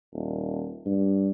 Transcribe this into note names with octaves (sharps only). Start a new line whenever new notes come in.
D#1
G2